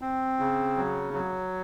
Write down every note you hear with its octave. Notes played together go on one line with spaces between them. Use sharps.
C4
C#3
F#3
F#3